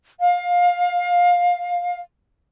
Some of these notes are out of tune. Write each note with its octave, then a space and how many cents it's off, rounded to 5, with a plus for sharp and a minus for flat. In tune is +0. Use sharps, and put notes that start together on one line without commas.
F5 +20